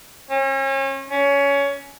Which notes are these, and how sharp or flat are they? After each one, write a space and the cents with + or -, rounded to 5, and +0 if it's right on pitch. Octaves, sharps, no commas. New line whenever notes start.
C#4 -35
C#4 +20